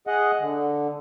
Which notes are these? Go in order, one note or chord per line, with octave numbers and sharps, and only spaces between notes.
G#4 D#5 F#5
D3